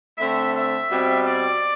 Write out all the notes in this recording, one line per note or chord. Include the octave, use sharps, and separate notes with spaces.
D3 A3 C4 E5
E5
B2 G3 C4
D5